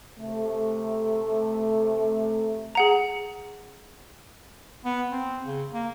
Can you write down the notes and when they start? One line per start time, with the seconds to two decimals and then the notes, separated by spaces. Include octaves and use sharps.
0.19 C3 A3
2.75 G#4 F#5 A#5
4.85 B3
5.12 C4
5.45 C#3
5.73 A#3